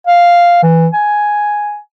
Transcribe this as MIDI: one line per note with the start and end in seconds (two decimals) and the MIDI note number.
0.07 0.62 77
0.63 0.87 52
0.93 1.77 80